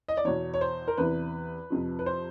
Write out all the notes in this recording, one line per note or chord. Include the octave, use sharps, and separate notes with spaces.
D#5
D5
E2 B2 C#5
C#5
C5
A#4
E2 C3 E3 B4
F2 C3 F3
B4
C5